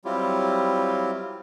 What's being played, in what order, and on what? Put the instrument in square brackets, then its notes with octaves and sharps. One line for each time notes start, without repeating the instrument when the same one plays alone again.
[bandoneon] F#3 G3 C4 E4 F4 G4